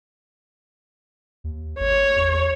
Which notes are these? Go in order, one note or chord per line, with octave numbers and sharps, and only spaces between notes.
D#2
G#1 C#5
E2